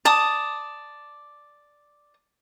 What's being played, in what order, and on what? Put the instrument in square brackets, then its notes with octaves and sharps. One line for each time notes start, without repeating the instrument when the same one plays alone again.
[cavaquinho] D5 A5 D#6